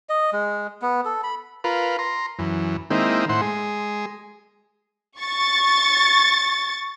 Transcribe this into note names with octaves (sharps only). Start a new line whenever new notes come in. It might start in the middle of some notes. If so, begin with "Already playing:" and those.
D#5
G#3
B3
A4
B5
F4 A#4 B4
A#5 C6
F#2 E3
D#3 G#3 A#3 C4 D#4 E4
A2 E4 C5 F#5 C6
G#3 G#4
C#6 A6